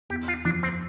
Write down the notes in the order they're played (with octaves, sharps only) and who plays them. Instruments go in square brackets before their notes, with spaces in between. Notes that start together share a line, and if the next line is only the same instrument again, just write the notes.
[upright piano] E2 [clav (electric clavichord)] G4
[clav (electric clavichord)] F4
[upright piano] F3 [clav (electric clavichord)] D4
[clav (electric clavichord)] C4